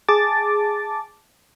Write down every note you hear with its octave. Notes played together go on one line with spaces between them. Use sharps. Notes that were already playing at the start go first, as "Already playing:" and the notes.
G#4 A5 D6 A6